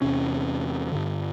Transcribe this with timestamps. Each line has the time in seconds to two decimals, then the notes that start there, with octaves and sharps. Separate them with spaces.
0.02 E2 C3 C#4
0.92 G2 D3